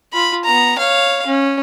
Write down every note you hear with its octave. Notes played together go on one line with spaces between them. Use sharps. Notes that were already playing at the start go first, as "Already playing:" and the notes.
F4 B5
B3 A#5
C#5 F5
C#4